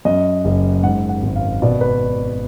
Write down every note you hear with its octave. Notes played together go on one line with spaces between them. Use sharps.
F#2 D#5
F#1
G#2 F#5
F#5
G#1
F5
B2 D5
B4